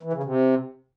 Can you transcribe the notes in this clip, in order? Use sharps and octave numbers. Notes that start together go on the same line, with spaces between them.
E3
C#3
C3